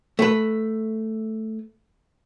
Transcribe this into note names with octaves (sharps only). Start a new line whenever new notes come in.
A3 B4